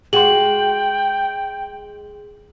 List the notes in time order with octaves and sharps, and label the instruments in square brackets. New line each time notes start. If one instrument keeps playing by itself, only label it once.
[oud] G#3 F#4 [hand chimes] G#4 C6 [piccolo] G5 [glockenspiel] F#7